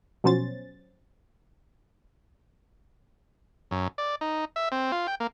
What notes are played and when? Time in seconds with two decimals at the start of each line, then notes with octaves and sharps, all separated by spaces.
0.24 B2 F3 F#3 C#4 C5 A6
3.71 F#2
3.98 D5
4.21 D#4
4.56 E5
4.72 C4
4.92 F4
5.07 G5
5.20 A#3